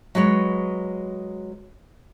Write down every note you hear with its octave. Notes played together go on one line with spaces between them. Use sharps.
F#3 G#3 B4 C#5